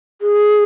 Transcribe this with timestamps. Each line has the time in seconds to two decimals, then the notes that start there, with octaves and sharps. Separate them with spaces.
0.21 G#4